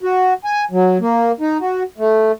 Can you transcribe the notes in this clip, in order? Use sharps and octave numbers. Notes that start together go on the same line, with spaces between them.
F#4
G#5
F#3
A#3
D#4
F#4
A3